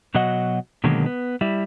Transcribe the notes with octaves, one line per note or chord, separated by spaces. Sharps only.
B2 F#3 F#4 D#5 F#5
B2 D3 D#3 F#3 G#3 A#3
B3
G3 E4